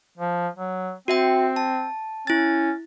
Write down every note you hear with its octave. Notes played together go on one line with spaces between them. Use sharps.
F3
F#3
C4 F#4 E5 G5
A5
C#4 E4 A6